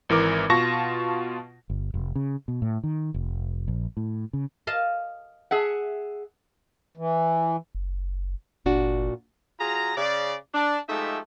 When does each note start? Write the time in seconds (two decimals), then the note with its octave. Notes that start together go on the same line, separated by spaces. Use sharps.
0.09 G#1 E3 A#4 D6
0.50 B2 F4 A5 C#6 A#6
1.70 G1
1.94 F1
2.15 C#3
2.48 B2
2.62 A2
2.84 D#3
3.14 F1
3.68 A#1
3.97 A2
4.33 C#3
4.67 D#5 F5 A5
5.51 G#4 E5 F#5
6.97 E3
7.75 F#1
8.66 G1 A#2 D4 F#4
9.59 F#3 F4 G#4 A#5
9.97 C#3 D5
10.53 D4
10.88 F3 G#3 A3 D#4 G4 E5